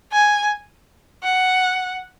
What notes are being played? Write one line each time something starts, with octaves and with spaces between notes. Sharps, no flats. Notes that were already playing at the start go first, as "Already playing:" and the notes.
G#5
F#5